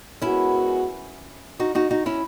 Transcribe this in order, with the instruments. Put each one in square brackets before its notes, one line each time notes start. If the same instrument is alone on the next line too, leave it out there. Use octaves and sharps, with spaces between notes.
[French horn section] G#3 B3 F#4 A#4 [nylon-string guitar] C#4 E4
[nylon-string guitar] D#4 F#4
D#4 F#4
D#4 F#4
C#4 E4